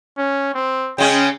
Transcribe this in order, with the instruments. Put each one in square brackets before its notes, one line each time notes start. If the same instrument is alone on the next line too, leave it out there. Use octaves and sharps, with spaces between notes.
[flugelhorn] C#4
C4
[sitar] C#3 G#3 C#4 [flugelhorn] G5